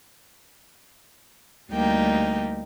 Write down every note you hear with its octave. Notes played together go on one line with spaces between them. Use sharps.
D2 G3 A#3 D#4 G5